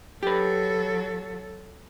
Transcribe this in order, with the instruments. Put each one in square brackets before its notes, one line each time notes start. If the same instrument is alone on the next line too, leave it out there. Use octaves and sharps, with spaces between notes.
[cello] F#3 A4 [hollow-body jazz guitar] G4 B4